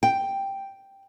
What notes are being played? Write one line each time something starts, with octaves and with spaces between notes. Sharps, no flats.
G5